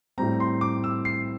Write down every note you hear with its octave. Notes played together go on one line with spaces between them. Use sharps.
A2 G3 C4 A#5
C6
D6
E6
C7